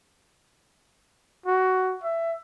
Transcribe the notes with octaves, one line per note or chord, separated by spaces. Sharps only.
F#4
E5